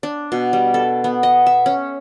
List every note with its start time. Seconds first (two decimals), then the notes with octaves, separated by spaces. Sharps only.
0.03 D4
0.32 B2
0.53 G3
0.74 A4
1.04 B3
1.23 D#5
1.47 E5
1.66 C#4